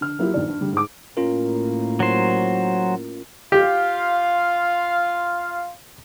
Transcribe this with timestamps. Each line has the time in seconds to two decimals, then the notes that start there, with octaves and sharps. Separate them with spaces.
0.01 D3 F6
0.19 F#3 A#3 E4 F4 G4
0.34 A#1 D#3 D5
0.48 G2
0.60 D2 D3 G3
0.72 G#2 D6
1.17 A2 A#3 C#4 F4 A#4
2.00 F#3 C5
3.52 F4 G4 F5